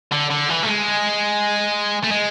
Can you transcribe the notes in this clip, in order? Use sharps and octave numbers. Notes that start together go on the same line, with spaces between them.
D3
D3
E3
A3
G#3
A3
G#3